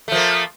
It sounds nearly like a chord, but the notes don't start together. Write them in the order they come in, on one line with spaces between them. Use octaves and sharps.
A3 F3 A#3